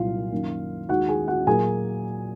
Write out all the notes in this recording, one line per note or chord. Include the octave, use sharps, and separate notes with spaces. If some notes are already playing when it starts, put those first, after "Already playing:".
Already playing: C2 A#2 F#3 F4 F5
F#2 D#3 A#3
D#2 D#3 G#3 F#4 F#5
G#4 G#5
F#4 F#5
A#2 F#3 A#3 G#4 G#5